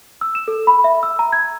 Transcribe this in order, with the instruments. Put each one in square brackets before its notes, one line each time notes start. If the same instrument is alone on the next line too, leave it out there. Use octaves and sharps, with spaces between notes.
[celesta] E6
E7
A4
B5
E5
E6
A#5
G#6